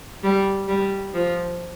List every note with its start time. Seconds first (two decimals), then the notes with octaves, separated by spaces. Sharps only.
0.24 G3
0.68 G3
1.14 F3